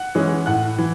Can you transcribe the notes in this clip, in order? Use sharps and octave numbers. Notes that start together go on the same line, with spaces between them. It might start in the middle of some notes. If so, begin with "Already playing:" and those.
Already playing: F#5 F#6
E3 G#3 C#4
A2 F#5 F#6
E3